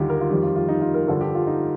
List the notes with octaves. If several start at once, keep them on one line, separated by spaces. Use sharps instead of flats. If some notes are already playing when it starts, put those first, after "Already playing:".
Already playing: D#2 D3 G3 D#4 F4 G4
A#4
F4
F2 D#3 G3 G4
F4
F4
D#4
F4
A#4
G2 D3 F3 A4
G4
F4
D#4